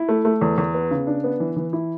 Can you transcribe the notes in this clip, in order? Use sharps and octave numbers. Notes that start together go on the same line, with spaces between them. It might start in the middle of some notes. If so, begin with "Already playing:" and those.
Already playing: E4
A3
A3
E2
E2
B3
C#3
D4
B3
E3
E3
E4